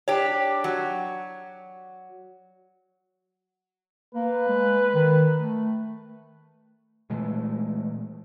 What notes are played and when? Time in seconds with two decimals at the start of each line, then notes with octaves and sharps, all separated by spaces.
0.08 D4 G4 C#5
0.64 F#3
4.15 A#3 B4
4.48 G#3
4.95 D#3
5.38 A3
7.10 A#2 E3 G#3 A3